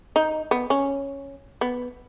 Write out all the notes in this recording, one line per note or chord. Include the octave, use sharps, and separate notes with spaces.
D#4
B3
C#4
B3